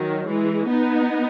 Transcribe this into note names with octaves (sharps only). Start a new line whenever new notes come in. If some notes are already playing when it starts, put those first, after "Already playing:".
Already playing: D#3 F#3
E3 G#3
B3 D#4